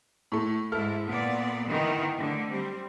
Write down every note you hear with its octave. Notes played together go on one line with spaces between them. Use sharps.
A2 A3
G#2 E4 A4 F6
A#2 B3 D5
D#3 E3 B3
D3 A3
G3 C4